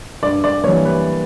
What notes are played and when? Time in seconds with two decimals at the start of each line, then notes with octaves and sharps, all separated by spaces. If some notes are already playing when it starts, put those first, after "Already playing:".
0.22 G2 D5
0.44 D5
0.64 A#3 C#5
0.66 E3 G3
0.85 B4